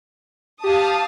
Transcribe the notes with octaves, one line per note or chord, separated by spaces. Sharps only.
G4 F5 A5 D#6